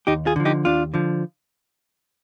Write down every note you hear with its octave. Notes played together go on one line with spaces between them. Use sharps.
D#2 D#4 G4
F4 G#4
D3 F3
D#4 G4
D#2 D4 F4
D3 F3